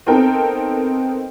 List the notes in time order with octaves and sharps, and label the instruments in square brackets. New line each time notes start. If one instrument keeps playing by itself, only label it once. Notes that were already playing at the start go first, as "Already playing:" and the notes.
[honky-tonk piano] B3 C4 D#4 A4 A#4 G5